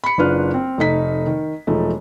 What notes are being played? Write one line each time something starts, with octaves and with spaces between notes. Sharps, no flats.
B5 C#7
F#1 D4 F4 B4 F6
C4
F1 A3 D#4 B6
D#3
E1 F3 A3 D#4